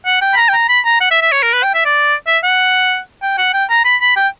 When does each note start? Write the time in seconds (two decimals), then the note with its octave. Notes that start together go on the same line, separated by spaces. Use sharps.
0.06 F#5
0.21 G5
0.33 B5
0.37 A#5
0.49 G5
0.53 A#5
0.69 B5
0.85 A#5
1.01 F#5
1.11 E5
1.21 E5
1.32 C#5
1.43 A#4
1.53 B4
1.63 G5
1.74 E5
1.85 D5
2.27 E5
2.43 F#5
3.22 G5
3.38 F#5
3.53 G5
3.69 A#5
3.85 B5
4.01 B5
4.16 G5